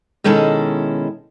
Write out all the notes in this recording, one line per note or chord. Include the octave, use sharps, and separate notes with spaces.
B2 D#3 G#3 C#4 E4 A4